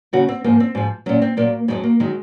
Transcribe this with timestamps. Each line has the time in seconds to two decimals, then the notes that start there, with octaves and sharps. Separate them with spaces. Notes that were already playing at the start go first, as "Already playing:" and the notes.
0.13 D#2 C#3 F#3 F#4
0.29 C4
0.44 G#2 F3 A#3
0.60 C4
0.75 G#2 F3
1.06 A#2 F#3 C#4
1.22 C4
1.37 A#2 F#3 A#3
1.68 F2 D#3 F#3 G#3
1.84 A#3
2.00 D#3 F#3 G#3